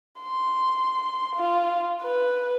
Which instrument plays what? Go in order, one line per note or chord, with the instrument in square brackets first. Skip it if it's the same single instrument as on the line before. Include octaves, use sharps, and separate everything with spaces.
[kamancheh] C6
F4
B4